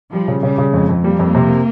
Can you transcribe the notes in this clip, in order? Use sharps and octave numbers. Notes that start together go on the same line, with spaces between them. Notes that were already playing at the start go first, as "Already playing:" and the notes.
F3 G3
C#3
C#3 G3
C#3
F2 G#3
F2
G3 A#3
F2
C3